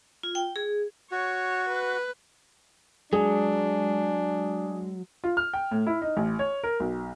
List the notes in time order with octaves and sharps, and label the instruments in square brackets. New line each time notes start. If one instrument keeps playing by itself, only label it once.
[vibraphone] F4
G5
G#4
[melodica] F#4 [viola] C#5
[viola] B4
[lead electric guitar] F#3 [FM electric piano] G#3 [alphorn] D4 [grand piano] G#4
[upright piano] F4
F6
G5
A2
E4
D#4
A1
C#5
A#4
B1